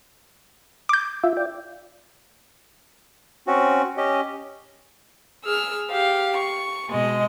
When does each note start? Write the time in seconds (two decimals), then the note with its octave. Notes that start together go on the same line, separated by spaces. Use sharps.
0.89 D6 G6
1.24 F4 E5
1.37 D5 G5
3.47 C4 C#4 F#4
3.97 C#4 G4 D#5
5.45 G#4 E6 F6
5.91 G4 F5
6.37 C#6
6.89 B2 G#3 D#5